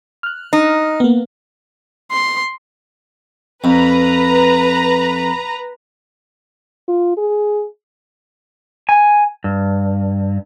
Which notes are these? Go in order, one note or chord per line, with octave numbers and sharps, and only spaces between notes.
F6 F#6
D#4
A#3 B3
C6
F2 B4 A#5
F4
G#4
G#5
G2